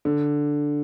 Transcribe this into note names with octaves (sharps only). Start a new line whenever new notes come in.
D3